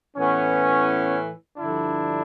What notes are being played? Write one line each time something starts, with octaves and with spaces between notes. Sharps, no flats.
A2 E3 B3 C#4
G2 D3 F3 D4 E4